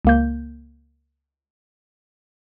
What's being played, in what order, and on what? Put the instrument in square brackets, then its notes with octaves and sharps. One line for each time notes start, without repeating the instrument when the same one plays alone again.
[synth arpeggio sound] C#2 A#3 G6